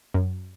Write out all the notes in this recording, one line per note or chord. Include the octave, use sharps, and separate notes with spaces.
F#2